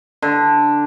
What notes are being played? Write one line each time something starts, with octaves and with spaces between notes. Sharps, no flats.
D3